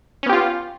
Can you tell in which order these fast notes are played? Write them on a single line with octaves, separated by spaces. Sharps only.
C#4 B3 G4 F4